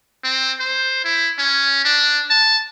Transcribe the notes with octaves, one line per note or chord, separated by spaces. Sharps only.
C4
C5
E4
C#4
D4
A5